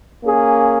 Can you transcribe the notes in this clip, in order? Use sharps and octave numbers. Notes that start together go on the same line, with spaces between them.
A#3 C#4 G#4